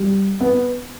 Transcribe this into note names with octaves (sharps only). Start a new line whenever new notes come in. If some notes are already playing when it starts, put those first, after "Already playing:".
Already playing: G3
B3